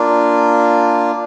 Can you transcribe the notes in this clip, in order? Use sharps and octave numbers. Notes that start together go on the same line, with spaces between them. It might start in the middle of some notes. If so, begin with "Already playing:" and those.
Already playing: A#3 D4 F4